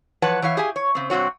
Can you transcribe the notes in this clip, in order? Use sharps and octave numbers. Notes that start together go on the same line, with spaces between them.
E3 F3 B4 C#5 F#5 A5
E3 C#5 E5 F5
G4 G#4 E5 F5 G#5
C#5
C#3 C4
G2 C3 C4 F#4 C#5